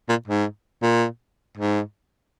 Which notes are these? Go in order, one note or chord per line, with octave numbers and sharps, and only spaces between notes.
A#2
G#2
A#2
G#2